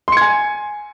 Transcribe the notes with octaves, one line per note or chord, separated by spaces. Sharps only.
G#5 C6 G#6 C#7